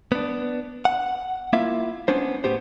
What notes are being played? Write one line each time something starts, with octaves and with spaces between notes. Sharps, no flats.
B3 D4
F#5
A#3 E4 F4 E5 F5
B3 C#4 D4 C5
A2 B3 G4 C5